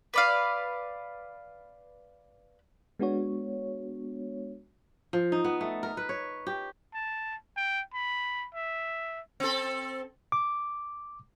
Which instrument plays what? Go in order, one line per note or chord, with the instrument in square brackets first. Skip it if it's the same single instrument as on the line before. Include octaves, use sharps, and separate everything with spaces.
[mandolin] B4 D5 F5
[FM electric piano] G#3 B3 D4 F#4 C#5
[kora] F3
D#4
B3
A3
A#4
B4
C#5
G4
[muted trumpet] A5
G5
B5
E5
[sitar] C4 A4
[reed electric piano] D6